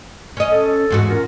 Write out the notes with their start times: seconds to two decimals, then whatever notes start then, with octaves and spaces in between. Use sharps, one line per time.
0.37 C#4 D#5
0.51 A4
0.90 E2 G#2 F#4
1.08 C#4 F4 A#4